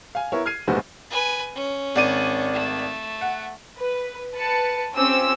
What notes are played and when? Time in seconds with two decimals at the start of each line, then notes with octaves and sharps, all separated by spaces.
0.15 F5 G#5
0.32 B3 E4 A#4 C#5
0.46 F6 G#6 C7 D#7
0.68 F1 A#1 G#2 B3 F#4 C5
1.10 B4 G#5
1.55 C#4
1.95 G#1 D5 D#7
2.54 A3
3.21 F#5
3.78 B4
4.35 B4 A5 C#7
4.95 C4 C#4 F4 G4 E6